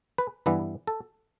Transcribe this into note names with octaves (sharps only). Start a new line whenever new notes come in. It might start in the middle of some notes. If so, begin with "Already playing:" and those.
B4
G2 E3 G3 B3 E4 B4
A4